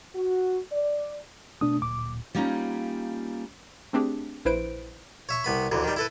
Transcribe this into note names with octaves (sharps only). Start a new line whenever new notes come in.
F#4
D5
B2 A3 D4 D#6
D1 A#2 D6
G3 A#3 C#4 D#4 F4
A3 C4 D4 G4 G#4
A#1 E4 B4 C5 D7
C#5 E5 C#6
C2 B3 B5
A1 D2 E3
D#3 G3
E4 A4 B4